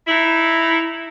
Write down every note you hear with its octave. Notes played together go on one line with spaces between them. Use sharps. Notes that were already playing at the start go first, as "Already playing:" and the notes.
D#4 E4